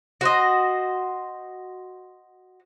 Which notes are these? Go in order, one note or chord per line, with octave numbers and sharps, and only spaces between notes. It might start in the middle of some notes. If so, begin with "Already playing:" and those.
F#4 C5 D#5